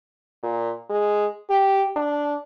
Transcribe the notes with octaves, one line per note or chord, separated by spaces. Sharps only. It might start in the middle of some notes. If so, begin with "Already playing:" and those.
A#2
G#3
G4
D4